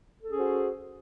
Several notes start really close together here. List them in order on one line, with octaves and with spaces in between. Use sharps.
A4 C#4 G#4 C5 F#4